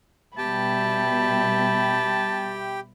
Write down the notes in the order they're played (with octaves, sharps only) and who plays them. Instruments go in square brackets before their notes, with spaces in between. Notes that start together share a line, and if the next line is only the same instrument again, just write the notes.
[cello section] B2 G3 [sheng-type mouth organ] G4 G5 [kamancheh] E5 B5 [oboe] A5